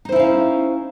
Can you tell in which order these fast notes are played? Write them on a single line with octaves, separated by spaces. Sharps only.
D#4 C5 E4 C#4 F5